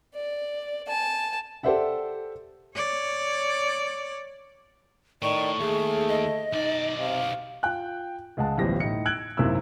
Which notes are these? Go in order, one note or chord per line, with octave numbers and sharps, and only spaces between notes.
D5
G#5 A5
G4 A4 C5 D5 E5 F#5
C#5 D5
A2 D#3 D5 C#6
D#2 A3 G#4
D#5
B1 D#4 D5
C3 F5
F4 G5 F#6
C#2 G#3 F#5 A5
D1 A1 B2 F3 G3 A#6
A2 D#4 C#7
E6 F#6 G#6 D7 F#7
G#1 F#2 C3 A#3 E4 E6